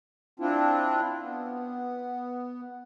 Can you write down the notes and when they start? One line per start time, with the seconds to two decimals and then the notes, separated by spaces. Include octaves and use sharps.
0.40 C4 D4 E4 F4
1.22 B3